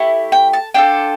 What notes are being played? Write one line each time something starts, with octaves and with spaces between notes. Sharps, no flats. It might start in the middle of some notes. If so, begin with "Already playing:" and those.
Already playing: A3 E4 G4
G5
A5
D4 F4 A4 G5